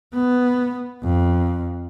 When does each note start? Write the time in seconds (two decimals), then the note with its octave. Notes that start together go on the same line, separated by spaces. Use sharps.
0.14 B3
1.03 F2